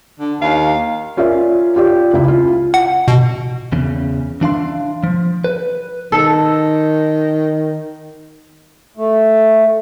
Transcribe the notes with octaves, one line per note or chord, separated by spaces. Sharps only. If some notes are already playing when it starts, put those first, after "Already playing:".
D3
D#2 F5
C#4 F4 A#4 D5 E5
F4 G4 D5
C#2 E4
F4
F#5
B2
E2 C#3
E3 D4 F5 C6
F3
B4
D#3 A4
A3